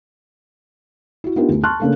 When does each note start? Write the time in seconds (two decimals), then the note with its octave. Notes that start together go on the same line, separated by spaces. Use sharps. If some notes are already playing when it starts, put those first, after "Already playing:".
1.24 E4 F#4
1.36 B3 D4 D#4 F4 G4 A#4
1.49 D2
1.64 A5 C6 C#6 F6 F#6
1.80 C#3 A3 A#3 D4 A4